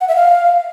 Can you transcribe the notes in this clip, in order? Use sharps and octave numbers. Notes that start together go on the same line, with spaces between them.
F#5
E5
F5